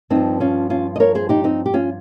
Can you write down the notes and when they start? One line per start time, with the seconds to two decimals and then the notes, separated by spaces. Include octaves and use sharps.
0.10 G2 F3 C4 D#4
0.40 C#4 F4
0.70 C#4 F4
0.96 D#5
1.00 A#4 C#5
1.15 G#4 C5
1.29 D#4 G4
1.44 C4 D#4
1.66 G4
1.74 C#4 F4